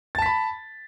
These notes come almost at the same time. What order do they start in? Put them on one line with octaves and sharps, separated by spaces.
A6 A5 B6 B5